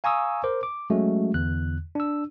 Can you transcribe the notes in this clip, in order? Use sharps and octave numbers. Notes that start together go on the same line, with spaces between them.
F5 G#5 A#5 C#6 D#6 E6
A#4 C5 D6
D6
F#3 G#3 A3 C#4 F#4
E2 D3 F#6
D4 E6